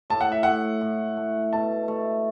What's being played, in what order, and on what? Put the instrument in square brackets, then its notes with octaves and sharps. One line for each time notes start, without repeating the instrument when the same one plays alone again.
[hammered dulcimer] A2 [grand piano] A5
[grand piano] F#5
E5
[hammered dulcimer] A2 [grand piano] F#5
[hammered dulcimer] A2
A3
[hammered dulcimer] B2 [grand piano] A5
[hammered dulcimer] A3